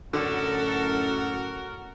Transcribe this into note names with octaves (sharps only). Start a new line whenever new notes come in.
F#2 A2 D3 F#4 A4 A#4